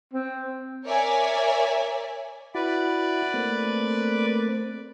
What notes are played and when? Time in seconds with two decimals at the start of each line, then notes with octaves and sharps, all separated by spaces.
0.14 C4
0.84 A#4 C#5 D5 E5 G#5
2.55 E4 F#4 B4 D5
3.34 A3 A#3 C4